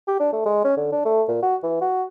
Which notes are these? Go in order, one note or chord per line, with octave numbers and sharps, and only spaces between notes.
G4
D4
A3
G#3
C#4
D3
D4
A3
A#2
F#4
E3
F#4